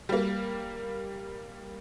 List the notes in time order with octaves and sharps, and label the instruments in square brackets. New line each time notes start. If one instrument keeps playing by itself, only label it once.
[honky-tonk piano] G3 A#3